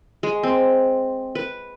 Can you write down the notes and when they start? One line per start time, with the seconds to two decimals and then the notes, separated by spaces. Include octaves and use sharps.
0.23 G#3
0.43 C4
1.35 B4